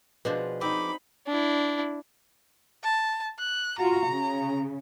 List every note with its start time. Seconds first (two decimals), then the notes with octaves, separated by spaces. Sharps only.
0.25 B2 F3 D4 G#4 B4 C5
0.61 C4 D#4 B5 D6
1.27 D4 E4
2.84 A5
3.39 F#6
3.78 F4 F#4 A#5
4.08 C#3